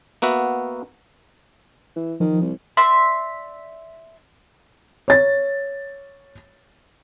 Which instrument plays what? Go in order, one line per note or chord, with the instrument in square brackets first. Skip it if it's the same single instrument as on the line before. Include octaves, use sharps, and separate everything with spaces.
[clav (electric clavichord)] A#3 B3 F#4 E5
[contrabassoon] E3
[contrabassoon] D#3 [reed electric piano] F3
[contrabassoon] C2
[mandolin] D5 E5 C6 E6
[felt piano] C#5 A6